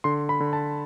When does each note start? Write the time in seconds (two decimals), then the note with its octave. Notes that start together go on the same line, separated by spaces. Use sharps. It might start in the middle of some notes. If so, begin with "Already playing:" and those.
0.04 D3 C6
0.29 B5
0.40 D3
0.53 A5